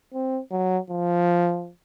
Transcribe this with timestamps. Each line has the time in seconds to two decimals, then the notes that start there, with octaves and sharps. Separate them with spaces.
0.13 C4
0.51 F#3
0.90 F3